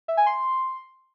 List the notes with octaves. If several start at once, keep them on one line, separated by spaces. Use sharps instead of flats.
E5
G#5
C6